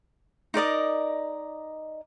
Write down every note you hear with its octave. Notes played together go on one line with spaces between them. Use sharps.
D#4 A#4 D5 D#5